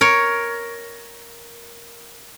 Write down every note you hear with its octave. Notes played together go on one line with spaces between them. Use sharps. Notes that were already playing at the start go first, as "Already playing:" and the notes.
A#4 C#5